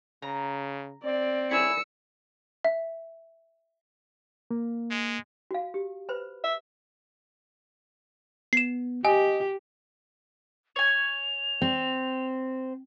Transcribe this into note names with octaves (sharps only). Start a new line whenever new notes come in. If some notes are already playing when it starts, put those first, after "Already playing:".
C#3 A#5
C4 D5
E4 G#4 C#5 E6 C#7
E5
A#3
G#3
F#4 F5
G4
B4 C5 B5
E5
B3 C7 E7
G4 D#5 G#5
C#5 G#5 F7
C4